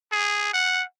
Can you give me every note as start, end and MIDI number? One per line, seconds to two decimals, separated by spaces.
0.12 0.51 68
0.53 0.83 78